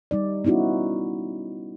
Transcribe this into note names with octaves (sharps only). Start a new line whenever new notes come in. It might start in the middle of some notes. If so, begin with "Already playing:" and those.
G3 D#4 D5
B3 C#4 D#4 E4 F#4